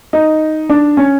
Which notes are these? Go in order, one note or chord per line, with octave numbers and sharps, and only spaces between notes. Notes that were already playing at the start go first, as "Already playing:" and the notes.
D#4
D4
C#4